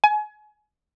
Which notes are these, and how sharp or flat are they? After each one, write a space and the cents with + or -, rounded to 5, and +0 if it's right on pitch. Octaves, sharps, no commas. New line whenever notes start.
G#5 +30